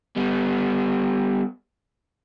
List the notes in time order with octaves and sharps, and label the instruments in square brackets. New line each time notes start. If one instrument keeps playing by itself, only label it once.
[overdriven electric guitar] G3 B3